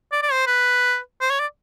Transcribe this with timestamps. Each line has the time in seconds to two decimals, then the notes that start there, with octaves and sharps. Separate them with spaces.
0.12 D5
0.23 D5
0.32 C5
0.47 B4
1.21 C5
1.30 C#5
1.40 D5